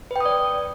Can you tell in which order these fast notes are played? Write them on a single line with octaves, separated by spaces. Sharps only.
B4 G5 D#6 D5